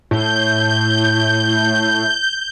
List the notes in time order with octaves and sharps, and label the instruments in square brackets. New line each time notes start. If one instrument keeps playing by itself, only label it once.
[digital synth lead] A2 [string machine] G6